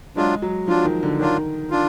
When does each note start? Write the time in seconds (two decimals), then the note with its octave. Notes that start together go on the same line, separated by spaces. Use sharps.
0.16 F#3 G#3 D4 F4
0.42 F#3
0.68 F3 F#3 D4 F4
0.85 D#3
1.03 D3
1.19 D#3 F#3 D4 F4
1.71 D4 F4